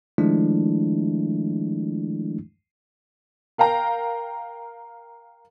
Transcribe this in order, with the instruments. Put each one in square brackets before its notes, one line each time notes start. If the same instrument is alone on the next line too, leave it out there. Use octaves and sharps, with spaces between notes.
[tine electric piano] D#3 F3 G#3 A3 D4 E4
[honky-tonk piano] A#4 F5 G5 A#5